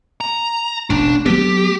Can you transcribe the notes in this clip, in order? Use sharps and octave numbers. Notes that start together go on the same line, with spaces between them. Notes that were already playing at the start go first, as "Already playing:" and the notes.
A#5
E1 A1 D4
F#3 A3 B3 G4